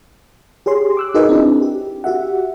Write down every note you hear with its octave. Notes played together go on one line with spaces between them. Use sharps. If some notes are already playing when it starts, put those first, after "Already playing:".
G4 G#4 C#5 C6
D6 E6 F#6
D#4 F#4 G#4 A#4 B4 D#5
C4 D4 E4 G#4
G4
F#4 G4 E5 F#5